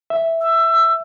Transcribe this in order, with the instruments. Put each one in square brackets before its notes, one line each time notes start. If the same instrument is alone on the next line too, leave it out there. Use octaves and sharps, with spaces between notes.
[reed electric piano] E5
[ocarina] E6